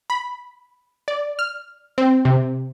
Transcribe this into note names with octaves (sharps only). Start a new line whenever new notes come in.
B5
D5
F6
C4
C3